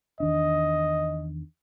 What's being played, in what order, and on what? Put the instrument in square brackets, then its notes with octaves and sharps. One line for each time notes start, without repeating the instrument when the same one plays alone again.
[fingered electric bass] E2 D#3 D4 [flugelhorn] D#5